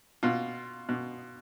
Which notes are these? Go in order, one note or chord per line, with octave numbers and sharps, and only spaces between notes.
B2 F4
B2